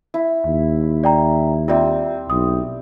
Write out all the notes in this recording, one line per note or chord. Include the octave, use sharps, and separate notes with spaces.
E4
D#2
D5 G5 A#5
G3 C4 F4 D5 E5
B1 D#6